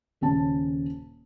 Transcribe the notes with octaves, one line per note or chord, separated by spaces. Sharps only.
D#1 C#3 C#4 A5